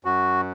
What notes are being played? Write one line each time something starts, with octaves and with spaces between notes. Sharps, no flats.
F#2 F#4